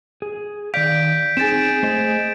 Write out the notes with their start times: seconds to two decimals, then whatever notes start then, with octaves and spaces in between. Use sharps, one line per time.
0.22 G#4
0.74 D#3 D5 F5 G6 B6 D7
1.37 C4 D#4 G#4 A6 D7 E7
1.83 A3 C5 D#5